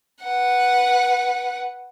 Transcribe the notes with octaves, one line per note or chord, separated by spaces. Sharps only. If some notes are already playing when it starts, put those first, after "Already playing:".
B4 F#5